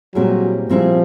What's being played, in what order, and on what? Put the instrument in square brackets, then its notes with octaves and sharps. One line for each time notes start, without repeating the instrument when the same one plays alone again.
[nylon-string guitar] A#2 G3 C4 E4 G#4 [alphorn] F#3
[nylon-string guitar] A#2 G3 C4 E4 G#4 [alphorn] F3